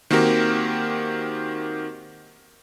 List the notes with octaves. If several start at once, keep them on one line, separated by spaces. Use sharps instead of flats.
D#3 A#3 C4 F#4 G4 A#4